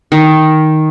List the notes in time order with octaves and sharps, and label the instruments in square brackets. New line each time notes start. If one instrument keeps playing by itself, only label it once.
[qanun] D#3